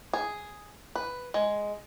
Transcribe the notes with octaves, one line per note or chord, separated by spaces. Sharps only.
G#4
B4
G#3